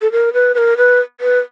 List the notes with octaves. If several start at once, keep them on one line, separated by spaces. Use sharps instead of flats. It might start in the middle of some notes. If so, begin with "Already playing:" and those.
A4
A#4
B4
B4
A#4
B4
B4